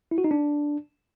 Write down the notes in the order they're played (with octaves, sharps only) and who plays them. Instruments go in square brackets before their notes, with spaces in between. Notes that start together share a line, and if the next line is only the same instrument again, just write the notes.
[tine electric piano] E4
F#4
D#4
D4